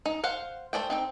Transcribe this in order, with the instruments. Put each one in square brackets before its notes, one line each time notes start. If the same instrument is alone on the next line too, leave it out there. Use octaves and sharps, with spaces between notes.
[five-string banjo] D#4
C5 F5 F#5
A3 G#4 C5 D5 G5
C4 D#4 G5